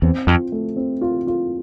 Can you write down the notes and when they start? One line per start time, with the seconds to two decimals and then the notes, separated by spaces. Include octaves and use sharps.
0.02 E2 C4
0.27 F2 F4
0.52 A3
0.77 C4
1.01 F4
1.27 F4